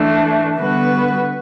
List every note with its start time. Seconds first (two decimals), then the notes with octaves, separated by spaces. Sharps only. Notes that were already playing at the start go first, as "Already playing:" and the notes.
Already playing: E3 A3 D4
0.55 D3 G3 B3 F#4 B4